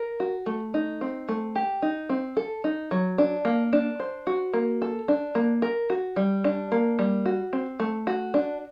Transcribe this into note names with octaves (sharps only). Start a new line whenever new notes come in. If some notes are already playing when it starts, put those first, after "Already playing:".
Already playing: A#4
F#4
A3
D#4
C4
A3
G4
D#4
C4
A4
D#4
F#3
D4
A#3
D4
C5
F#4
A#3
A4
D4
A#3
A#4
F#4
G3
D4
A#3
G3
F#4
C4
A3
F#4
D4